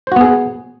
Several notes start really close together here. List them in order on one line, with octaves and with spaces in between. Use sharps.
C5 F#4 B3 G#4